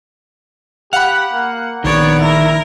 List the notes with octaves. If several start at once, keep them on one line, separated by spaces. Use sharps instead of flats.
G4 F5 F#5 B5
A#3
A#1 D#3 B3 C#5 D5
E4 A#4